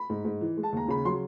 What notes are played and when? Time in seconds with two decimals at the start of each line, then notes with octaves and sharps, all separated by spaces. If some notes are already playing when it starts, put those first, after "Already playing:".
Already playing: B5
0.10 G#2
0.25 G#2
0.41 E3
0.57 G#3
0.63 A5
0.73 D#2 A#5
0.88 C#3 B5
1.05 F#3 C6